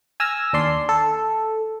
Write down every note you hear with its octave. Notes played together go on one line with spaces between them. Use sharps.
G#5 E6 F6 A#6
D#2 D4 D5 C6 C7
A4